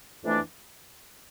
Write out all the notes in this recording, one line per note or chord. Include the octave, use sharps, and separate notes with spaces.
F2 E3 A3 D4